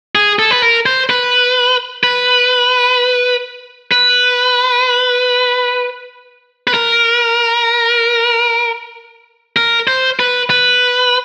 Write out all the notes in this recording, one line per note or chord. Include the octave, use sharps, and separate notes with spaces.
G#4
A4
B4
A#4
C5
B4
B4
B4
B4
A#4
A#4
C5
B4
B4